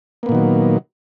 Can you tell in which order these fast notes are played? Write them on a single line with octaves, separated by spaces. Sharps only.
A#3 B3 A#2 D#3 F#3